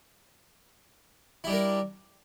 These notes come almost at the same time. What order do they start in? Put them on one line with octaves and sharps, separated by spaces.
E4 G3 D4 A#4